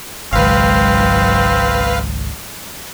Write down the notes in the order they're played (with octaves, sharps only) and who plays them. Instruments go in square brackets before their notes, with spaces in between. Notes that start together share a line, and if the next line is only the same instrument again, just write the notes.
[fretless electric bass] G#1 C#2 [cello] G#2 F#3 [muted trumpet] C4 [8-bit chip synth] B4 F5